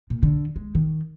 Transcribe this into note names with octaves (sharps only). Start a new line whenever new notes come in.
A#2
D3
G#3
D#3